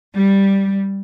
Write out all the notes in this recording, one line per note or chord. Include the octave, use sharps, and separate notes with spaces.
G3